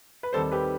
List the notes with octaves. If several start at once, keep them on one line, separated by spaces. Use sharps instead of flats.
B4
D#2 D#3 G3 C4 A4 C5
G4 B4